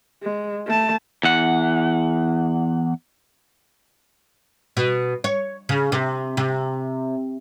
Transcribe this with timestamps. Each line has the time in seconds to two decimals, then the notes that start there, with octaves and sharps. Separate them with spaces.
0.23 G#3
0.67 A3 A5
1.23 E2 F#5
4.77 B2
5.24 C#5
5.69 C#3
5.92 C3
6.37 C3